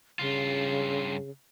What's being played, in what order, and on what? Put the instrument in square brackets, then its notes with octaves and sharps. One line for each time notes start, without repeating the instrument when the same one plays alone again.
[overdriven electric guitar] G2 F4 [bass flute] C#3